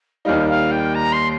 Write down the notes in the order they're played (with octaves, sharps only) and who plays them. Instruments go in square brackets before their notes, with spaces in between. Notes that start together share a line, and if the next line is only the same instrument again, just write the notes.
[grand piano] D#2 D#3 G3 D#4 [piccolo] F5
[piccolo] F5
G5
A#5
C6